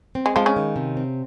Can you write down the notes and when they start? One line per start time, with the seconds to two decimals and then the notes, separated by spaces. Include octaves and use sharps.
0.15 C4
0.26 G#3
0.36 F3 G#3 F4
0.46 C#3 C#4
0.56 D#3
0.76 C3
0.97 C4